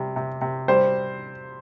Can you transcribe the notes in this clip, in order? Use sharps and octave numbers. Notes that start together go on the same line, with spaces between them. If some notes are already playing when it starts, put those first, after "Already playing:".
Already playing: C3 G3
C3
C3
G3 C5